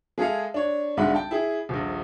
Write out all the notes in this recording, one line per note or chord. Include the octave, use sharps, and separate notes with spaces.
G#3 G#4 A4 E5 F5
D4 C#5
B1 G#2 D3 E5 F#5 B5
G5 A5
E4 G#4
D#1 A#1